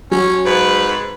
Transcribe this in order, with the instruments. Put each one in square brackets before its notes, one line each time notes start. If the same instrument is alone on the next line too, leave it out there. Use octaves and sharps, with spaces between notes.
[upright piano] F#3 [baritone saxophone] C#4
[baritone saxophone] G#2 [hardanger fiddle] B4